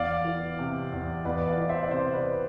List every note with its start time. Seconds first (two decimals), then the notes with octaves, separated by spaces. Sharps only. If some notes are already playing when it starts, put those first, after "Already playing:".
Already playing: E2 D5 F5
0.25 E3
0.59 C3
0.92 E2
1.25 E2 B4 D5
1.47 D5 F5
1.58 E3
1.69 C5 E5
1.83 D5
1.91 C3 C5 E5
2.14 B4 D5